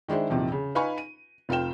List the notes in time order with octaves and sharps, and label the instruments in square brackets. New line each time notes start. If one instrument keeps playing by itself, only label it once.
[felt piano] D#3 G#3 D4 E4 C5
A#1 E2 C3 D#3 F3
C#3
D#4 B4 F5 G#5 B5 C#6
D#7
F1 F4 F5 G5 E7